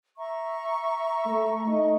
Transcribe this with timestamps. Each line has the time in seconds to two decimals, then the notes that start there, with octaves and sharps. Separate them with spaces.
0.17 E5 A#5 C#6
1.27 A3
1.66 A3 D#4 D#5